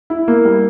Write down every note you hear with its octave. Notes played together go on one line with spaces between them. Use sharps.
E4
A#3
G3